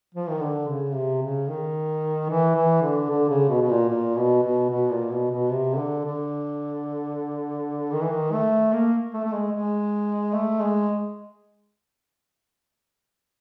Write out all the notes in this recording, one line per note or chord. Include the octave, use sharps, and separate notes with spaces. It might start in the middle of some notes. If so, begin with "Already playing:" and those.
F3
D#3
D3
C#3
C3
C#3
D#3
E3
E3
D3
D3
C#3
B2
B2
A#2
A#2
B2
B2
B2
A#2
B2
B2
C3
C#3
D3
D3
D#3
E3
D#3
A3
A#3
A3
A3
G#3
G#3
A3
G#3